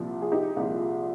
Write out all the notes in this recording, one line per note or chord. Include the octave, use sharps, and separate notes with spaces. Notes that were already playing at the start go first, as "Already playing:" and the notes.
Already playing: C2 A#2 F3
G#4
D#4 G4
C2 A#2 F3 F4 G#4